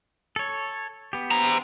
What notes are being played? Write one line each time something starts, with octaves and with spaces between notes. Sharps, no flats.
A4 C#5
B3 G4
C5 A#5